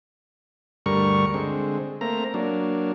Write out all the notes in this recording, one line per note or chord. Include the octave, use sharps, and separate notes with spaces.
D2 G2 G3 A#4 C#6
D3 G#3 C4
A3 A#3 C4 A#5
F#3 A#3 D4